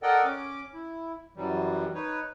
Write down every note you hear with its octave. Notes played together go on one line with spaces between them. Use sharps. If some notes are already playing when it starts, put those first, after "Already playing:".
A4 A#4 D5 D#5 F#5 G5
C#4 D6
E4
F#2 E3 F#3 G3
D#4 B4 C#5